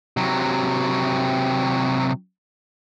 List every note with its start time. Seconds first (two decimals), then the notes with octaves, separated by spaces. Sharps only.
0.17 C3 F#3